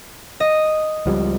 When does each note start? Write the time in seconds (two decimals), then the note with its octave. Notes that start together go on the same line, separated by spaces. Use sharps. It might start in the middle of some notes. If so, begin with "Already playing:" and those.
0.40 D#5
1.06 C#2 F3 G3